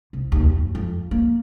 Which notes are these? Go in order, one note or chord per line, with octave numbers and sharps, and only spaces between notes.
C2
D#2
F#2
F2
A#3